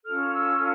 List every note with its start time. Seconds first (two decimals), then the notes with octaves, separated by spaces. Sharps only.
0.05 C#4 F4 A4 F6
0.33 E6